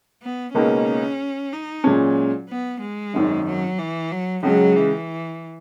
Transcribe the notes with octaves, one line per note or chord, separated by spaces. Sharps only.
B3
C#2 B2 A#3 C#4 D#4 A#4
D#4
A#2 F#3 G#3 C#4
B3
G#3
G#1 F#2 D#3
F#3
E3
F#3
C#2 C#3 F#3 G#3
E3